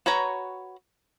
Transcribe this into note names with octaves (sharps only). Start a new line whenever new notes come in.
F#4 B4 C#5 A#5